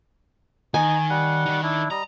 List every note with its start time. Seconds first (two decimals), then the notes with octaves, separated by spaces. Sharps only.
0.74 D#3 D#4 G#5
1.10 G3 F#5
1.46 D#3 D#4
1.63 D4 E4
1.91 G3 D#5 A#5